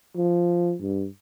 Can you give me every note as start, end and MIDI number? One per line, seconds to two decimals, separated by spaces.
0.16 0.74 53
0.81 1.06 43